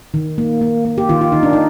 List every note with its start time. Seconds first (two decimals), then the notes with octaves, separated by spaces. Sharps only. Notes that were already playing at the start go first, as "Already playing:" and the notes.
0.14 D#3
0.38 A#3
0.61 A#3
0.85 A#3
0.98 G4
1.09 D#3 F4
1.21 F4
1.32 D#3 D#4
1.43 D4
1.53 D#4